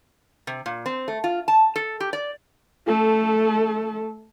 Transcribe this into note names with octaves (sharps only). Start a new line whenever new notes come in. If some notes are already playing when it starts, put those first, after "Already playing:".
C3
A#2
C4
A3
F4
A5
A4
G4
D5
A3 A4